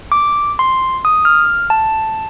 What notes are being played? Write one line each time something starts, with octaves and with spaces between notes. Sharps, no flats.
D6
C6
D#6
F6
A5